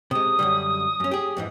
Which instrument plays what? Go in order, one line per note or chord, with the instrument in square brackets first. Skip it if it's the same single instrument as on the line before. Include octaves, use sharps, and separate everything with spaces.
[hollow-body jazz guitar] C3 G#3 [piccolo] D#6
[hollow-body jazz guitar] F#2 D3 G3
F#2 C#4
G4 G#4
F2 G#2 E3